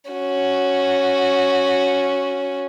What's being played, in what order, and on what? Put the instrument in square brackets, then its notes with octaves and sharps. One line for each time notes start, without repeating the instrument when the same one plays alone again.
[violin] C#4 F#4